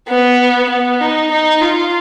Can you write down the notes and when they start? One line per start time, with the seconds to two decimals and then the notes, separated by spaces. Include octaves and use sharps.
0.09 B3
0.70 B3
1.01 D#4
1.31 D#4
1.61 F4